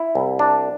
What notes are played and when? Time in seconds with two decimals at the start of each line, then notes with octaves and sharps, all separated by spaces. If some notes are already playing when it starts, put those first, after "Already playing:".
Already playing: E4
0.15 C2
0.39 D4